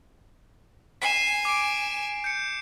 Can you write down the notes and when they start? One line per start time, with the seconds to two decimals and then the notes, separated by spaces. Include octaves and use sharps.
1.02 G#5 B6 C7 E7
1.45 D6 D7
2.24 G6 C#7